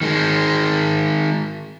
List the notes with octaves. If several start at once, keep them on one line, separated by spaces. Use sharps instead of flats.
D#3 G#3